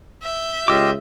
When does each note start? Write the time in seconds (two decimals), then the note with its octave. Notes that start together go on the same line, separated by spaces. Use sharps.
0.23 E5 G6
0.68 C#2 F4 G4 D#5 D6 E6